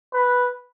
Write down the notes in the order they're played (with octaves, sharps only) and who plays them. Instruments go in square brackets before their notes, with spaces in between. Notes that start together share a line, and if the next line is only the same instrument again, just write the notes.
[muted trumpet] B4